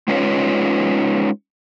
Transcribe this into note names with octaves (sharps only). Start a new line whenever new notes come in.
G#3 C#4 D#4 F4 B4 C#5